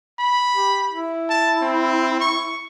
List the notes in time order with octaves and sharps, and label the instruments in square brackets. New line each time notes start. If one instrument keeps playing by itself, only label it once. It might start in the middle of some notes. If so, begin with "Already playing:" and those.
[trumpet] B5
[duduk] G4
E4
[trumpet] A5
C4
C#6